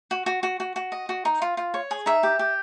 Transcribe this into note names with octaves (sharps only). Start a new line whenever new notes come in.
F#4
F#4
F#4
F#4
F#4
D#5
F#4
D#4
F4
F4
C#5
G#4
D#4 E5
G4
G4